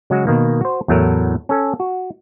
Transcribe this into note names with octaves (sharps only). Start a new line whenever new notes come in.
C#3 F#3 G#3 F#4
B2 D#3 A#3
F#4 C5
E2 A2 F#3 A3 A#4
C#4 A4
F#4